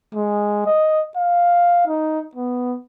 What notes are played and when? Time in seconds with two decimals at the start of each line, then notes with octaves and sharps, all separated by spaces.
0.14 G#3
0.66 D#5
1.17 F5
1.87 D#4
2.35 B3